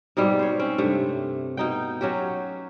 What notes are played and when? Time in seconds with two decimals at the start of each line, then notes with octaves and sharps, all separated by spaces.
0.17 G#2 B2 G3 C4
0.39 C5 C#5
0.59 C4 C#4
0.78 G2 C3 A3
1.57 B2 D#4 G5
2.01 F#3 C#4 F#4 G4